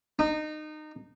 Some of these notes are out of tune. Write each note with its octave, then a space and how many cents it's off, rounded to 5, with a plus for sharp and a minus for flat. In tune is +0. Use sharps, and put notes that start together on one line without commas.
D#4 -25